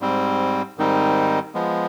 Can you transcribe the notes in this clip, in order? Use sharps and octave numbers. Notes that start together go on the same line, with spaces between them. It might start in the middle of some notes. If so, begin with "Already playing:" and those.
G#2 G3 C4
G#2 D#3 G3 C4 D#4
F3 G#3 B3